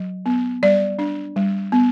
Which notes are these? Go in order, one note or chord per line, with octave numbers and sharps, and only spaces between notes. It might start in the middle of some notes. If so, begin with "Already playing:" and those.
Already playing: F#3
B3
G3 D5
D4
G3
B3